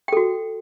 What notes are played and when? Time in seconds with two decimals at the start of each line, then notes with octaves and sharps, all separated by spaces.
0.08 G5
0.12 A4
0.17 F#4